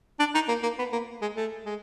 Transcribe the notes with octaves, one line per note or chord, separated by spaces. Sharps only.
D4
D#4
A#3
A#3
B3
A#3
G#3
A3
G#3